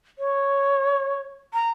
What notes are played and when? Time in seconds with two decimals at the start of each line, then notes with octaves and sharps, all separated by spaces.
0.18 C#5
1.53 A#5